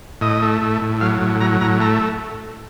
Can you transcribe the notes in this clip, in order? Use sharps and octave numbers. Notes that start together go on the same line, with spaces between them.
A2 D#5
A3
A2
A2
F#3 F5
A2
F#3 A#5
A2 A#5
A3 A#5